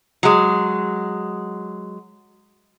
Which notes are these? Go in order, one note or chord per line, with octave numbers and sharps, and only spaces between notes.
F#3 G#3